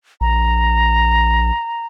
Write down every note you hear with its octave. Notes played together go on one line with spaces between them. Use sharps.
A#1 A#5